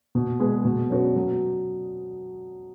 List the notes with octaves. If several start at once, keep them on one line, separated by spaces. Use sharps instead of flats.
B2
G#3 B3 G#4 B4
B2
F#3 C#4 F#4 B4
F#3